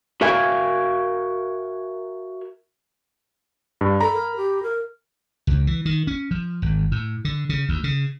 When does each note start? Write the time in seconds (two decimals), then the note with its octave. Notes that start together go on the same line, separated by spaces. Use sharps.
0.21 F#4 A#4 E5 F5 G5 G#5
3.81 G2
4.01 A4 A#5 B5
4.14 A#4
4.36 G4
4.63 A#4
5.47 C#2
5.67 E3
5.85 D#3
6.07 C#4
6.31 F3
6.62 G#1
6.92 A2
7.25 D3
7.49 C#3
7.69 D2
7.84 C#3